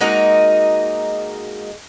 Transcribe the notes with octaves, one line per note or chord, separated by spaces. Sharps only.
G#3 A#3 D#4 F#4